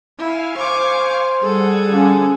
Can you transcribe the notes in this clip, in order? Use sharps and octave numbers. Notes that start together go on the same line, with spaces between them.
E4 F5 G#5 F6
C5 C#6 D6
G3 G#4 A4 F#5
D3 F3 C#4